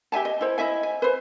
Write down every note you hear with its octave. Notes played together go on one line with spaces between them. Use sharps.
G4 E5 G#5 A5
D#5
E4 C5
E4 D#5 E5 G#5
G#5
B4 C5